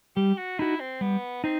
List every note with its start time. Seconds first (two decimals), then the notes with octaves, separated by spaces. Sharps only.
0.16 G3 G4
0.37 F#4
0.59 D#4 E4 F#4
0.80 C4
1.01 G3 B3
1.44 C4 D#4